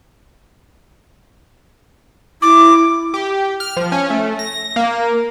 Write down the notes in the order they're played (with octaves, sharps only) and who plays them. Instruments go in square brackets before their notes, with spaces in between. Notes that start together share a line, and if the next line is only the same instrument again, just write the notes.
[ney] E4 [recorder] D6
[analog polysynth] G4
F6
F3
C#4
A3
A#6
A#3